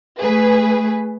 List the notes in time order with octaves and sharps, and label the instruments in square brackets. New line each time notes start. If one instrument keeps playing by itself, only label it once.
[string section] A3 G#4 B4